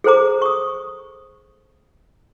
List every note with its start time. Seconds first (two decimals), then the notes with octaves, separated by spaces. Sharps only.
0.04 G#4 A4 C5 A#5 D6
0.42 C#6 D#6